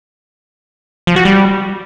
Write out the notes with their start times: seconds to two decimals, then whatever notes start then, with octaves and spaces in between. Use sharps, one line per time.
1.07 F3
1.16 F#4
1.25 G3